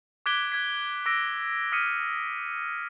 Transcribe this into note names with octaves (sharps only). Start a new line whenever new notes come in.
D6 F#6 G#6 B6 D7 G7
F#6 G#6 B6
D6 E6 A#6 D7
D#6 F6 B6 C#7 D#7